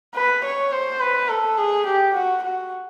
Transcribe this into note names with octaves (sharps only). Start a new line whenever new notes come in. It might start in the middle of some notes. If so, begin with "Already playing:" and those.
B4
C#5
C5
B4
A4
G#4
G4
F#4
F#4